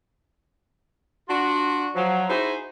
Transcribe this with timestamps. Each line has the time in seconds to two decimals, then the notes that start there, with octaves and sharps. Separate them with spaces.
1.29 D4 F4 F#4
1.95 F3 F#3
2.29 D#4 E4 F#4 G#4 C5